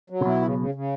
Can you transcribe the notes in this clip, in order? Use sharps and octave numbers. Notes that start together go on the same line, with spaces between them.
F#3
C#3
B1 B2 E4
C#3
C#3
C#3